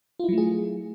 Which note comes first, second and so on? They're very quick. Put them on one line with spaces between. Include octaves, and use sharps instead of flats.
F4 E4 F#3 A3 G#4